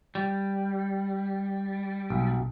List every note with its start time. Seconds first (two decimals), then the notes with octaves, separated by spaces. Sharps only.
0.15 G3
2.10 B1